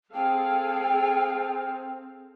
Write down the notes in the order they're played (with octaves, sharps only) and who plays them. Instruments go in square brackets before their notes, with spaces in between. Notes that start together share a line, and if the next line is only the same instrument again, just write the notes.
[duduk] C4 [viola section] G#4 A4 F5 [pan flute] G5